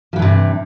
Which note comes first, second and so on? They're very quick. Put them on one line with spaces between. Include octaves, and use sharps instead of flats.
F3 E3 G2 C3